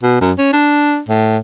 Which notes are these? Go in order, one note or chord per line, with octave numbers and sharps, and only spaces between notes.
B2
F#2
C#4
D4
A2